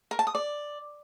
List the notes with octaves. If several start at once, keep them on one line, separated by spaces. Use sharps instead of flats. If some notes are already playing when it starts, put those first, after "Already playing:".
A#4
A5
D#6
D5